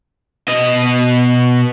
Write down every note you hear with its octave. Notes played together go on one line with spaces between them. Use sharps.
B2 D#5